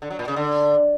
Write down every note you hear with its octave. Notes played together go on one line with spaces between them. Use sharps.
D3
F#3
A#2
C#3
D3